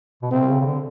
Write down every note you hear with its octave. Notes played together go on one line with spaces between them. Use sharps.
B2
C3 C4
C#3
C#3
D3